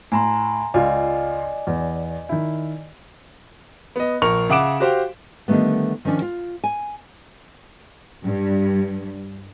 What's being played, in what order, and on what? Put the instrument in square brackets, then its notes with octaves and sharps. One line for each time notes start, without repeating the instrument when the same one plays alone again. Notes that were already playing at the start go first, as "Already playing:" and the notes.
[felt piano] A2 [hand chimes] G#5 A#5 C6
[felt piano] C#2 F4 [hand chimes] D5 D#5 G#5
[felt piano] E2
D#3 E4
[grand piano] B3 D#5
A#1 A#4 C#6 F7
C#3 E5 F#5 D6 D7 E7
F#4 G4 C5 F5
[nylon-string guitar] D3 D#3 G3 A3 B3
D#3 F3 C#4 D4
F4
G#5
[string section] G2